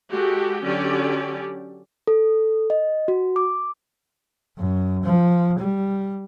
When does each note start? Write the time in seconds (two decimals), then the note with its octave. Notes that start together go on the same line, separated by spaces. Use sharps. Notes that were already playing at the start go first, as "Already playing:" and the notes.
0.11 G#3 F#4 G4 A4
0.63 D3 F#3 C#4 G4 D5
2.07 A4
2.70 D#5
3.08 F#4
3.36 D6
4.58 F#2
5.03 F3
5.59 G3